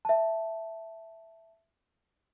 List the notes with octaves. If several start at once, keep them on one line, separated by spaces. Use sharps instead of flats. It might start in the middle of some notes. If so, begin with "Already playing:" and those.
E5 A5